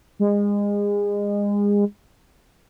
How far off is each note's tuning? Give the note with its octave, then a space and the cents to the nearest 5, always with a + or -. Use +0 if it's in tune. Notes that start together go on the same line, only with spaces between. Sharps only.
G#3 -30